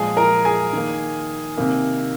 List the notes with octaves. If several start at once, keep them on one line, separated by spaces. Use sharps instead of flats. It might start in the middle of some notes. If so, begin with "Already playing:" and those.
Already playing: A#2 F3 G#3 G#4 G#5
A#4 A#5
G#4 G#5
D#3 A#3
C3 D#3 A#3